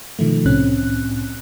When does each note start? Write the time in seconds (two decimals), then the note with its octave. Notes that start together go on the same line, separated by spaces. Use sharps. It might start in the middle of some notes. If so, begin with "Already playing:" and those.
0.19 B2 D#3 F3 A3
0.45 C2 A2 C3 C4 C#4 F#6